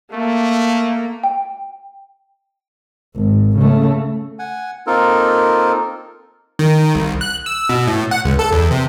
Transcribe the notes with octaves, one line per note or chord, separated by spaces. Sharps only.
A3 A#3
G5
G#1
C#3 A3
F#5 G#5
A#3 C4 D#4 F4 A4 A#4
D#3
C2
F#6
E6
B2
A2
F#5
C#2
A4
E2
C3